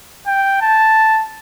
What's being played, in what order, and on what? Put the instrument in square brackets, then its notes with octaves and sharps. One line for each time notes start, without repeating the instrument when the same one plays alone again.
[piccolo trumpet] G5
A5